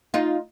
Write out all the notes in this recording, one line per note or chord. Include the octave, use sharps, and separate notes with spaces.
D#4 F4